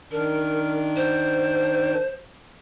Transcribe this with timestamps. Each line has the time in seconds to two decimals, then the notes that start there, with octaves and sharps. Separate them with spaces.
0.12 D#3 D4 A#4
0.96 C5